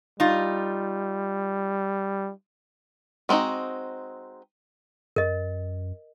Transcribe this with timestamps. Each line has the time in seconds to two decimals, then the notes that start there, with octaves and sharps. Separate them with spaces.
0.20 G3 D#4 F4
3.29 G#3 C4 D4 D#4 F#4
5.16 F#2 A#4 D#5